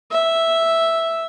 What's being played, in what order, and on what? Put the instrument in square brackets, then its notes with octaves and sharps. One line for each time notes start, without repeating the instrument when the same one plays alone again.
[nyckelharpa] E5